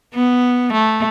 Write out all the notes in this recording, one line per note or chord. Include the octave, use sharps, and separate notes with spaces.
B3
A3